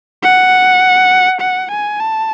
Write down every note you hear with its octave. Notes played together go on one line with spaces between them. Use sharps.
F#5
F#5
G#5
A5